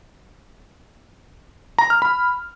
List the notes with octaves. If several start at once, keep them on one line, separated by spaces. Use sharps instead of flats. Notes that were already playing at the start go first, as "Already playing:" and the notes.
A#5
F6
B5